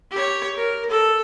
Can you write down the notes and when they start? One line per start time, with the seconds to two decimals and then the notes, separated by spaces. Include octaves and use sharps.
0.11 G4 C#5
0.56 A#4
0.90 A4